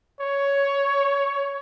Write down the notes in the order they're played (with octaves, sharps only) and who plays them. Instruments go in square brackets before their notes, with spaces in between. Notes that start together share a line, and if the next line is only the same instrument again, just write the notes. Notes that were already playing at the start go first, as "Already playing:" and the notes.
[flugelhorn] C#5